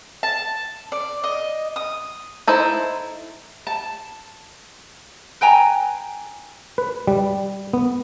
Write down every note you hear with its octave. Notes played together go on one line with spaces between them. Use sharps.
A5
D5
D#5
D#6
D#4 E4 A4 C5
A5
B4 G5 G#5 A#5
B4
G3
B3